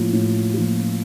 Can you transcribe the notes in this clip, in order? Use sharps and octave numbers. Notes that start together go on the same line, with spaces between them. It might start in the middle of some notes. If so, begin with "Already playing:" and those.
Already playing: A2 F3 A#3 F4
A2
F3 A#3 F4